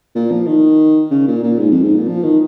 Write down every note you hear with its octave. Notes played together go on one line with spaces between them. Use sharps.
A#2
F3
D#3
C#3
A#2
A#2
G#2
F2
G#2
A#2
F3
D#3